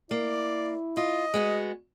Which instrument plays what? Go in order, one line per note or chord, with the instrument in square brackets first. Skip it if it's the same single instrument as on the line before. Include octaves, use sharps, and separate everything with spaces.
[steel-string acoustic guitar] A#3 [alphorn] E4 [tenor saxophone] D5
[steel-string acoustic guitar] F4 [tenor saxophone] D#5
[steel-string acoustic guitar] G#3 B3 F#4